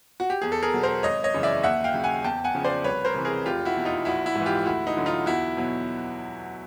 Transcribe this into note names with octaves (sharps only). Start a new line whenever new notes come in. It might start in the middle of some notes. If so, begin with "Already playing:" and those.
F#4
G4
E2 G#4
A4
G#4 A#4
B2 F#3
A#4 C5
G#1 C#5 D#5
C#5 D#5
F#2 C#3 E3
D5 E5
D#2 E5 F#5
F5 G5
C#3 F#3
F#5 G#5
E2 G5 A5
F#5 G#5
C#3 F3
C5 D5
C2 B4 C#5
A#4 C5
C3 E3
G#4 A#4
F1 F4 G4
E4 F#4
E2 B2
D#4 F4
A#1 E4 F#4
E4 F#4
G#2 E3
F4 G4
D2 E4 F#4
D#4
D3 F#3
D#4 F4
E2 E4 F#4
B2 F#3